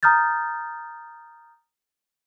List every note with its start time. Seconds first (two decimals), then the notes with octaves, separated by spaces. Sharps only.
0.03 A#5 D#6 F6 G6 A6